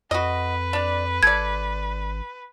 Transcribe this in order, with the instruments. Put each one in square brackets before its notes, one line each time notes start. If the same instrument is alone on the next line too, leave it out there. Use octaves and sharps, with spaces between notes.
[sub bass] F2 [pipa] F#4 D#5 [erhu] B4
[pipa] D4 D5
[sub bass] G#1 [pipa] A4 D5 [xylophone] G#6